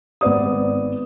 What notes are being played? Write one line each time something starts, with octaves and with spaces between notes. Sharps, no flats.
G#1 B3 D5 D#6